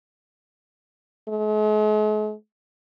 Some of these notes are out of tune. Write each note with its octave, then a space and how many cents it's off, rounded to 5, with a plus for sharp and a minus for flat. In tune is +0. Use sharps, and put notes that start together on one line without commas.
G#3 +45